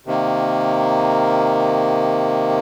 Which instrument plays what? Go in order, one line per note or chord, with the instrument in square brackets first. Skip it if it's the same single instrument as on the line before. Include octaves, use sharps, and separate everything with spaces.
[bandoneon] C3 D#3 A#3